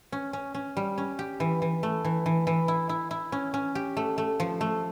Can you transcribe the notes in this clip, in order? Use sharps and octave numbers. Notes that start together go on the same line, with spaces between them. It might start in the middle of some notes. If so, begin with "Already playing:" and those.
C#4
C#4
C#4
G3
C#4
G4
E3
E3
A3
E3
E3
E3
E4
E4
E4
C#4
C#4
G4
A3
A3
F3
A3